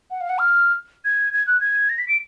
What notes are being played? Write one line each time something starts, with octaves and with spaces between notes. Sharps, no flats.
F#5
F5
F#5
F6
G#6
G#6
F#6
G#6
A#6
B6
D7